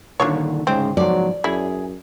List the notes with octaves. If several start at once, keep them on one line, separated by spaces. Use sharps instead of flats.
A#2 D3 D#3 D4 F4 C#5
D2 G#2 C#3 G#3 C4
G#2 F3 F#3 D5
F#2 E4 G#4